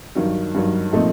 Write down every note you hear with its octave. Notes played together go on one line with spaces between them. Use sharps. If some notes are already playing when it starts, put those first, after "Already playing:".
G2 D#3 F#3
G2 D#3 F#3
A#2 F3 A3 C4 D#4